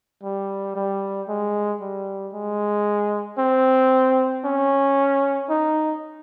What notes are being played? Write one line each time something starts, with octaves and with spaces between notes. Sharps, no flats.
G3
G3
G#3
G3
G#3
C4
C#4
D#4